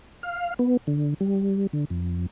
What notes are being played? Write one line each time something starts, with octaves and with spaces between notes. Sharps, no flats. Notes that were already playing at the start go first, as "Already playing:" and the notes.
F5
B3
D3
G3
D3
F2